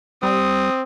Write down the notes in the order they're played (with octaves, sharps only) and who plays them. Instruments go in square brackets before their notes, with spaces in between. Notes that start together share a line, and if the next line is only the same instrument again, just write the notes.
[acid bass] G3 [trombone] C4 [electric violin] D#6